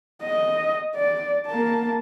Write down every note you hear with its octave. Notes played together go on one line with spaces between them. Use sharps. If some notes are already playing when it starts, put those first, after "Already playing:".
D#5
D5
A#3 A5